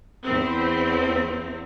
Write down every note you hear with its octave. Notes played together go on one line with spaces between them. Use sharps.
E2 C4